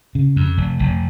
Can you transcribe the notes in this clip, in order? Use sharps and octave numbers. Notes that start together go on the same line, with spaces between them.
C#3
F2
F1
F1